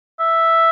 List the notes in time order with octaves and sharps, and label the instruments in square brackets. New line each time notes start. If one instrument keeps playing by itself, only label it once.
[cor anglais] E5